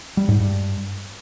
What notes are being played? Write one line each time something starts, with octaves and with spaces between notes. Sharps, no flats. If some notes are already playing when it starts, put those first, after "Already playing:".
G3
G#2
G2